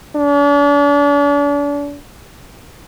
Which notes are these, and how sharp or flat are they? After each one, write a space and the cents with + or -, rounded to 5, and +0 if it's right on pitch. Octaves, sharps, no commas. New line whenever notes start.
D4 -40